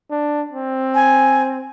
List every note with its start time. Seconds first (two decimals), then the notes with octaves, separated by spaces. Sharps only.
0.10 D4
0.52 C4
0.95 G#5